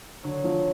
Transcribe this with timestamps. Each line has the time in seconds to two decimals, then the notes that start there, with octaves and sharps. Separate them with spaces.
0.23 D3 F#3
0.44 F3 F#3